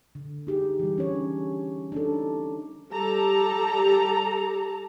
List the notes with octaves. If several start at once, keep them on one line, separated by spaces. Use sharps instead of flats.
D3
D#4 G4 G#4
E3 G3
C#4 D4 C#5
D4 D#4 A4
G3 G4 A4 A5 A#5